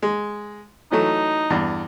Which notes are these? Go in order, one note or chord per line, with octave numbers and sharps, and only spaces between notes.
G#3
E3 F#3 A3 D#4
E2 G2